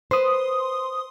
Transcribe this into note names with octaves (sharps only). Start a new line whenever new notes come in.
B4 C5 C6 D#6